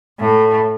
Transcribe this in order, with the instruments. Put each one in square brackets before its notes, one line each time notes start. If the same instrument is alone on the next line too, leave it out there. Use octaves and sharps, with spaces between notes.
[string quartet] A2 A3